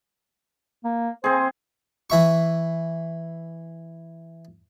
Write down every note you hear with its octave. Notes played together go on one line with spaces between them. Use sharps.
A#3
C4 G#4 C5
E3 E5 C#6